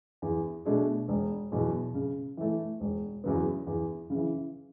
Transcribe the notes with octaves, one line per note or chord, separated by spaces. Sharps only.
E2
B2 A3 D4 G#4
E1
E2 B2 F#3
C#3
E3 A3
E1
E2 C#3 F#3 B3
E2
C#3 E3